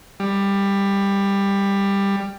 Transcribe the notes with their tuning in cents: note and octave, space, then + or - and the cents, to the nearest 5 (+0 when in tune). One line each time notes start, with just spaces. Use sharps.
G3 +15